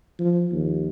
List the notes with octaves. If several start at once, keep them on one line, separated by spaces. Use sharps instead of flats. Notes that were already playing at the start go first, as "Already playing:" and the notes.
F3
D#2